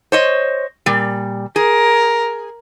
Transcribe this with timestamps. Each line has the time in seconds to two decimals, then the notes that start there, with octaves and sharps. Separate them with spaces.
0.12 C5 C#5 D#5
0.86 A#2 G3
1.56 G#4 A#4